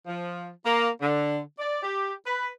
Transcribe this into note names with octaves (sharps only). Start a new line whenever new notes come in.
F3
A#3
D3
D5
G4
B4